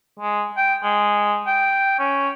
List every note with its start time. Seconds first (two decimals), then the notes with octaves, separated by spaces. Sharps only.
0.19 G#3
0.57 G5
0.83 G#3
1.47 G5
1.99 C#4